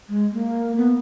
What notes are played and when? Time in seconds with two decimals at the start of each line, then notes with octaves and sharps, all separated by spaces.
0.09 G#3
0.32 A#3
0.77 B3